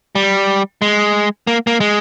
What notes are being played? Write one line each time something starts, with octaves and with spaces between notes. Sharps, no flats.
G3
G#3
A#3
A#3
G#3